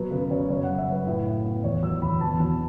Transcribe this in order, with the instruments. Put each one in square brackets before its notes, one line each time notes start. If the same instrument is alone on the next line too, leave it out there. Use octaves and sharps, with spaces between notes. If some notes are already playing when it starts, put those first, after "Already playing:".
Already playing: [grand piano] B2 F#3 B4
C#3 B4
C#3 C#5
F#2 C#5
F#5
F#2
E5
F#2 B4
A2
A2
B3
E2 C#5
F#3 E6
E2 B5
E2 A5
B2